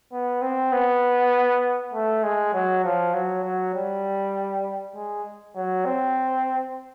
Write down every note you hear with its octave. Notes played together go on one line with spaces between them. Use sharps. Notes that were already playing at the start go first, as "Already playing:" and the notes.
B3
C4
B3
A3
G#3
F#3
F3
F#3
F#3
G3
G#3
F#3
C4